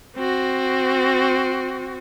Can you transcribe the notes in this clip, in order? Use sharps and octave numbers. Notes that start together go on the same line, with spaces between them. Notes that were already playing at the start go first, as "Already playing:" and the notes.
C4 F#4